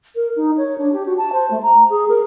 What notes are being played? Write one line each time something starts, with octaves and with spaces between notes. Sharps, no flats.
A#4
D#4
C#5
D4
G4
F#4
A5
C5
A3
A#5
G#4
A#4